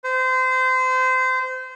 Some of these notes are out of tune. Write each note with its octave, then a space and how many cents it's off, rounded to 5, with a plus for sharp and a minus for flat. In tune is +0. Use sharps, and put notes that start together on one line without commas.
C5 -25